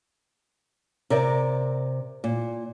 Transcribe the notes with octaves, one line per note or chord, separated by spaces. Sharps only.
C3 A#4 D5 E5
A#2